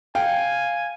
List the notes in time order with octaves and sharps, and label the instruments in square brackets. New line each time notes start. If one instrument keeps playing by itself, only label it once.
[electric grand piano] F5 [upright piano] G5 [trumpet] G#5